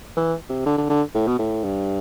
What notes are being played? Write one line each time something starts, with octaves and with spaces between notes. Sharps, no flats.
E3
C3
D3
D3
D3
A2
B2
A2
G2